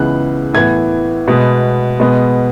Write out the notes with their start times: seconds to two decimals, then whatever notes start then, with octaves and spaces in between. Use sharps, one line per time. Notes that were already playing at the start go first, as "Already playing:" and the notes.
Already playing: C#2 C#3 E3 B3 F#6
0.54 A2 E3 B3 G#6
1.28 B2 G#3 B3
2.00 B2 G#3 B3